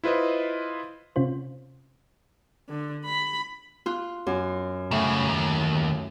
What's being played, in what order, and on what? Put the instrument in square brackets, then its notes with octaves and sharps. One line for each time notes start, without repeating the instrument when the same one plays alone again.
[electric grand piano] E4 F4 B4 C5 D#5
[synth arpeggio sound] C3 C#4 F4 C5
[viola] D3
B5
[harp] F4 F#6
F#2
[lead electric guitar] C2 C#3 [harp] A2
[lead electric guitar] D#2